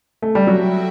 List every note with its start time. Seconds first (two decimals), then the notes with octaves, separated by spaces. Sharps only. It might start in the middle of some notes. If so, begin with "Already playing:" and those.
0.22 A3
0.35 G3
0.46 F#3 F#4 A4 E5 G5